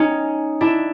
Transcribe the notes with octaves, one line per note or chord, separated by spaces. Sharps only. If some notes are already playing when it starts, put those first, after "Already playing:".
Already playing: C#4 D#4
D4 E4